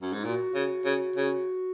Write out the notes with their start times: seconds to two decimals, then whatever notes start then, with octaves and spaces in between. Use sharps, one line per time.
0.01 F#2
0.12 G#2
0.24 A#2 F#4
0.54 C#3
0.85 C#3
1.16 C#3